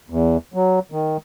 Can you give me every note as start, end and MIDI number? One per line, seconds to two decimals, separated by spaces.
0.10 0.37 40
0.54 0.79 54
0.92 1.17 51